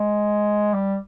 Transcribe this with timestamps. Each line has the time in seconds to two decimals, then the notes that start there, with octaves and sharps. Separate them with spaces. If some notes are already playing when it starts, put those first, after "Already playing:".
Already playing: G#3
0.74 G3